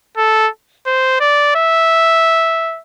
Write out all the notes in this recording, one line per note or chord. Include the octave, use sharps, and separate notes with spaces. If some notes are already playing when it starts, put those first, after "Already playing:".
A4
C5
D5
E5